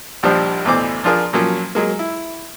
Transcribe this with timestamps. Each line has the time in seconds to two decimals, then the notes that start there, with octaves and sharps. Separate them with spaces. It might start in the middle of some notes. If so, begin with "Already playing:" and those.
0.23 A#1 D#2 F3 G3 D4 C5
0.65 A1 D2 B2 E3 C5 D6
1.04 F3 D4 F4 G#4 A#4 D5
1.33 A#2 F3 F#3 A#3 C#4
1.75 F#3 G#3 A#3
1.99 E4